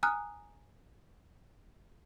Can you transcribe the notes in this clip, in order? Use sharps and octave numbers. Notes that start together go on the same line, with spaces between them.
G#5 A#5 D#6 F6 F#6